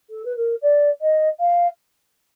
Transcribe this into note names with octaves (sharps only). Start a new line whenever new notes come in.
A4
B4
A#4
D5
D#5
F5